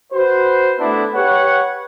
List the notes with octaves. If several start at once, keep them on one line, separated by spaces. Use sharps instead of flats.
F#4 B4 C5
A3 B3 D4 E4
G4 B4 C#5 F#5